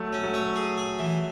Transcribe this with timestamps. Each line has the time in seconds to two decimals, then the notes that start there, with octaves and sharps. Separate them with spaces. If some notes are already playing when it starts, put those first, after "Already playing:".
Already playing: F#3 A3
0.13 C#4
0.23 F#3 A3
0.34 C#5
0.56 G#4
0.78 G#4
0.99 E3